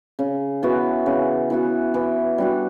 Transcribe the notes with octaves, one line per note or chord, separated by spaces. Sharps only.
C#3
E3 B3 F#4
C#3
E3 B3 F#4
E3
G3 D4 F#4